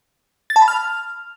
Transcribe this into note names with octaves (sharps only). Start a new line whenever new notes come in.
A6
A5
B5
F6